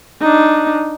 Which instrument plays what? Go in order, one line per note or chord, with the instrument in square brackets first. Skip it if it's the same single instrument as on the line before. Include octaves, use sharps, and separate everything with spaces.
[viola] D4 D#4